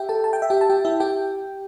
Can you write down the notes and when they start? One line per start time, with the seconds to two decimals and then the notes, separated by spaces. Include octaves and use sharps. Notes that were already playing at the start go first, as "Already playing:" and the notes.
Already playing: G4 E5 G5
0.09 A4 A5
0.24 A5
0.33 G5
0.42 E5
0.50 G4 G5
0.61 A5
0.70 G4 G5
0.85 E4 E5
1.00 G4 G5